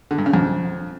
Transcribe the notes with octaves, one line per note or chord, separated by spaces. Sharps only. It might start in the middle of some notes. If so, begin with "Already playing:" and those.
D3
G2
C#3
F2